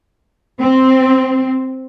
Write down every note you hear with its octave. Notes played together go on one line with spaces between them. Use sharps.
C4